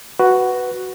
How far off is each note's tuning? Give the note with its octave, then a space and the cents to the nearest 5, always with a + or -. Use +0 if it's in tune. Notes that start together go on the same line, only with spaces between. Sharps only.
F#4 +5 B4 +0